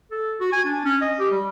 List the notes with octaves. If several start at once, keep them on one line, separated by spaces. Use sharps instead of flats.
A4
F#4
G#5
D4
C#4
D#5
G4
G3